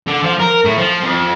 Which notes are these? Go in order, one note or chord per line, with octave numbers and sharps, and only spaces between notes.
D3
F3
A#4
A2
F3
F2